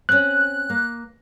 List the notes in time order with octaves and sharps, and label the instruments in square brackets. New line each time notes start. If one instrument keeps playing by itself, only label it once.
[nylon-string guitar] C4 C#4 [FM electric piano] F#6
[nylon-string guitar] A#3